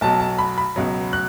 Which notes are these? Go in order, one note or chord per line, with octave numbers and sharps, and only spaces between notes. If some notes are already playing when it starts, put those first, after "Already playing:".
B1 B2 F#3 A5
A5
B5
B5
C#2 B2 F#3
F#6